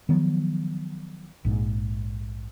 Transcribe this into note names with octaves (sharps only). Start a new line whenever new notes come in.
D#3 F3 F#3 B3
A#1 G#2